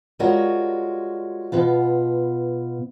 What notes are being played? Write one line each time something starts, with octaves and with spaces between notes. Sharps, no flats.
G3 G#3 F4 F#4 A#4 C#5
B2 B3 F4